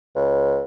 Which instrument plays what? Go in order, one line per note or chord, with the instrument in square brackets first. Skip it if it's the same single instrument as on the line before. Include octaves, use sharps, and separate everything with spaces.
[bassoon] C#2